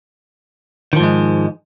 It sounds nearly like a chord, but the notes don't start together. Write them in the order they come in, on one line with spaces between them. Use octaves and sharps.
D#3 F3 G#2 G#3